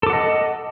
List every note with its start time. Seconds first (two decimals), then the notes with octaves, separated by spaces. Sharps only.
0.03 A4
0.07 D6
0.10 F#5
0.13 D#5